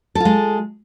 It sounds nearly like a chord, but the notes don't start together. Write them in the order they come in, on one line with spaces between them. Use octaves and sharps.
A4 F4 G#3